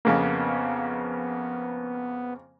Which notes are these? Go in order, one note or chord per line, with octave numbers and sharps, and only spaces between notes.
F2 C#3 A#3 B3